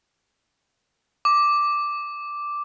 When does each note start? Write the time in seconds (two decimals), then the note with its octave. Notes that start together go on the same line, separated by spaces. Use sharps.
1.25 D6